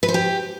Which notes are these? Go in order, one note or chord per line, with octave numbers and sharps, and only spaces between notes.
B4
C5
G4